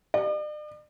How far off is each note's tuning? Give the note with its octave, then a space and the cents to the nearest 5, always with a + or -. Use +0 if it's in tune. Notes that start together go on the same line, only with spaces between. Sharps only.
D5 +45